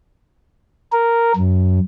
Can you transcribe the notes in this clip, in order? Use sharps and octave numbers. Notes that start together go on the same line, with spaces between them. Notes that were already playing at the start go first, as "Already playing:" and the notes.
A#4
F#2